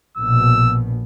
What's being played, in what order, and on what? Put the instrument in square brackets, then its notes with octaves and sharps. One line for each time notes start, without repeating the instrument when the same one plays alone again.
[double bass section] A#1 B2 [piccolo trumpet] E6